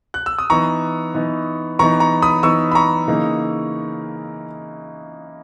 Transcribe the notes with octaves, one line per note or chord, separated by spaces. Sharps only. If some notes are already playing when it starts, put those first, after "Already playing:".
F#6
E6
D#6
E3 B3 D#4 A#5 C#6
E3 B3 D#4
E3 B3 D#4 A#5 C#6
A#5 C#6
B5 D#6
E3 B3 D#4 C#6 E6
B5
A#5 C#6
C#3 E3 A#3 D#4